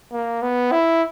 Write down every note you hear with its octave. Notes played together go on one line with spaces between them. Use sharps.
A#3
B3
E4